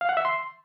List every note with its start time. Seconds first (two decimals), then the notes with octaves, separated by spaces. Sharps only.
0.01 F5
0.09 F#5
0.17 E5
0.25 C6